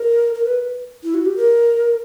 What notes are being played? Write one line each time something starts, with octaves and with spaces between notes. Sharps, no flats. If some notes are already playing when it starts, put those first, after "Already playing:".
Already playing: A#4
A#4
B4
E4
F#4
G4
A#4